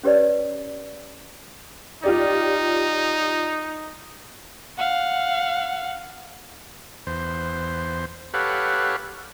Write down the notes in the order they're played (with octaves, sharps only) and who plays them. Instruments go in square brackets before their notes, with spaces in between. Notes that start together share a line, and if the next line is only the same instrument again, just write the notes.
[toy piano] C#4 G4 B4 C#5 D5
[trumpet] D#4 [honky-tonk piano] F4 G4 D5
[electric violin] F5 F#5
[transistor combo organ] E2 C5
G4 A4 B4 C#5 F5 F#5